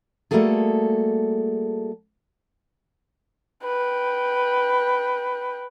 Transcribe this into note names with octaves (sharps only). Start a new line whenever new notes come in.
G3 A3 A#3 F#4 G#4 A4
B4 G5